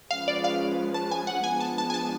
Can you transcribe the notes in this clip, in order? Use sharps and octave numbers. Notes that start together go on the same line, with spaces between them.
F3 G#3 C#4 F4 B4 F5
D5
F5
A5
G#5
F#5
F3 G#3 B3 D4 G#5
A5
A5
G#5
A5